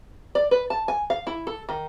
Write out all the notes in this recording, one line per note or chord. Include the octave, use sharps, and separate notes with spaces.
D5
B4
A5
G#5
F5
E4
A4
D#3